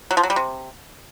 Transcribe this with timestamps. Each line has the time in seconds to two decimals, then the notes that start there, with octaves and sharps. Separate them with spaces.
0.11 F#3
0.17 F3
0.23 F#3
0.30 G3
0.36 C3